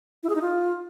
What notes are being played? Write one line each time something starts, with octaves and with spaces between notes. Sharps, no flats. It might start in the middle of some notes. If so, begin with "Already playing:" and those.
E4
G#4
D#4
F4